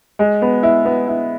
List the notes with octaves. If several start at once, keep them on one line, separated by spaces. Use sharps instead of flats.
G#3
B3
E4
B3
E4